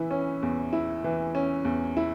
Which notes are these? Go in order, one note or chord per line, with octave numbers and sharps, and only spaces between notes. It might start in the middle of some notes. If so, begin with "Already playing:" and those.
Already playing: E3 E4
C#4
E2
E4
E3
C#4
E2
E4